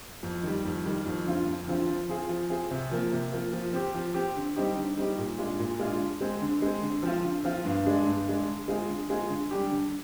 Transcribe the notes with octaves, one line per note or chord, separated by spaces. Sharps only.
F2
D#3 G3
F2
D#3 G3
F2
D3 F3 C4 F4
F2
D3 F3 C4 F4
F3
C4 F4 G#4
F3
C4 F4 G#4
C3
F3 A#3
C3
F3 A#3
F3
C4 G4
F3
C4 G4
D3
G3 C4 D#4 G4
D3
G3 C4 D#4 G4
A#2
G#3 D4 F4
A#2
G#3 D4 F4
D3
G#3 C4
D3
G#3 C4
D3
F3 C4 F4
D3
F3 C4 F4
G2
D3 G#3 D4
G2
D3 G#3 D4
D3
G#3 C4 F4 G#4
D3
G#3 C4 F4 G#4
D3
G3 D4 G4
D3